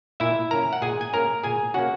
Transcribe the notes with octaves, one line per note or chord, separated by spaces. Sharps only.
A#2 E4 E5
A#3 C#4 A#4 A#5
F#5
A#2 G#4 G#5
G#5
A#3 C#4 A#4 A#5
A#2 G#4 G#5
A#3 C#4 F#4 F#5